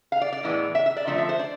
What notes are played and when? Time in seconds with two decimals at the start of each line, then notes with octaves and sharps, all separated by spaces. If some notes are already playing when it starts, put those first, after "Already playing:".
0.12 F5
0.21 D5
0.32 D5
0.43 A2 E3 G#3 B3
0.75 E5
0.86 E5
0.97 D5
1.07 D3 F3 A3 C4 E5
1.18 E5
1.29 C5
1.39 D5